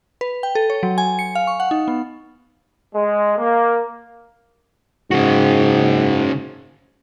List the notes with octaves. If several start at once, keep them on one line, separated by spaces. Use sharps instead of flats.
B4
G5
A4
C#5
F#3
G#5
C#7
F5
C#6
F#5
D#4
B3
G#3
A#3
G#2 C#3 F#4